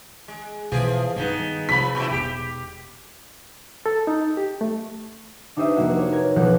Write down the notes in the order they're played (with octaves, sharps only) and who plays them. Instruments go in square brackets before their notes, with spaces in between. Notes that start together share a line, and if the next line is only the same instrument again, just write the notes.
[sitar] G#3
[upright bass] B2 [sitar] E3 F3 G#4
[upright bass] G2 D#3 [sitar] G#3 B3 D#4
[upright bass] C3 [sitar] F3 [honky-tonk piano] B5 B6
[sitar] A#2 E4
[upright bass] E1 [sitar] G4
[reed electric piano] A4
D#4
G4
A3
[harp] D4 D#4 G4 C5 D#5 E5
F1 A#3 F#4
C#5
A#4 G#6
E1 B1 F3 F#5 G6 C#7